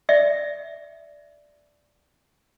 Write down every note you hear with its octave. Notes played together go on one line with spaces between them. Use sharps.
D5 E5